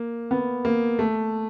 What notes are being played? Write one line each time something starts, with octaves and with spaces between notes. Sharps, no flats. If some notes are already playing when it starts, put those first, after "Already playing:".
Already playing: A#3
B3
A#3
A3